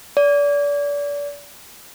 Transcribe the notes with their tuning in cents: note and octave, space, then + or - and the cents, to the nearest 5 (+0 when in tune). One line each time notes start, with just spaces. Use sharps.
D5 -35